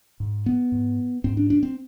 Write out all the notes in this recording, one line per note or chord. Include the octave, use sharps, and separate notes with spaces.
G#2
B3
G#2
G#2 C4
D4
D4
C4